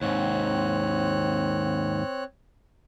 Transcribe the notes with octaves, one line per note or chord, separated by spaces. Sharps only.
D#2 G#2 C4 C#5 F#6